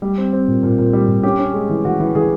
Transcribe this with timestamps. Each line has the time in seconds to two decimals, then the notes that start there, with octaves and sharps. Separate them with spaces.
0.02 G3
0.18 C4
0.33 C4
0.48 A#2
0.63 A#2
0.78 A#2
0.93 G3
1.08 A#2
1.23 C#4 G4
1.39 C#4
1.54 G#3
1.69 E3
1.85 E3 F#4
2.00 E3
2.15 E3 G#4